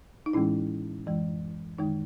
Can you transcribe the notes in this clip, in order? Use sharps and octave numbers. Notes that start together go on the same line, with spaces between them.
D#4
A2 E3 G#3 C#4 E4
F#2 E3 G#3
F#2 D#3 G#3 D#4